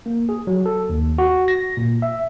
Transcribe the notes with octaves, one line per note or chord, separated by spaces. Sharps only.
A#3
G#4
F#3
A4
D#2
F#4
A#6
A#2
E5